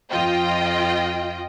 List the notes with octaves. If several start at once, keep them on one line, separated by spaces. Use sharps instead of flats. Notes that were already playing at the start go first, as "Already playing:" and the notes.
F2 F4 D#5 G5